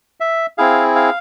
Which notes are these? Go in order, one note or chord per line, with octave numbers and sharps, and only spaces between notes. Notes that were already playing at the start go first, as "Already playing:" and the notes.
E5
C4 E4 G#4 F5
F5